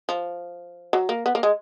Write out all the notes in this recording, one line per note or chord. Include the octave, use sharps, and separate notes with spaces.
F3
F#3
A#3
B3
A#3
G#3